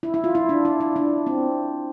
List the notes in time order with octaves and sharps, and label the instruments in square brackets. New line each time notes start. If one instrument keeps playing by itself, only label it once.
[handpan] E4
E4
F4
E4
D4
E4
E4
D4
C4